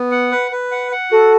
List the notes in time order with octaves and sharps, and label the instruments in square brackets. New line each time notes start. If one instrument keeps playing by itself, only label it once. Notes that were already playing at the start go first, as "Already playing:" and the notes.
Already playing: [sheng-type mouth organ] B3
F#5
B4
B4
F#5
F#5
[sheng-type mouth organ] F#4 [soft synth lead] A4